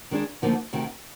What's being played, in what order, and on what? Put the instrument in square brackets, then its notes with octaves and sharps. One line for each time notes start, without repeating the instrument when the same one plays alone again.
[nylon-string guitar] D#3 G#3 D4 G#4
D2 D3 F3 A#3 D#4
D2 C3 D#3